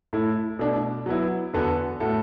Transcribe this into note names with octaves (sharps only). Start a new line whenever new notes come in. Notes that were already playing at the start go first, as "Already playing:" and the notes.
A2 A3 E4
B2 A3 D4
F#3 B3 E4
E2 D3 B3 F#4 A4
A2 A3 F#4 A4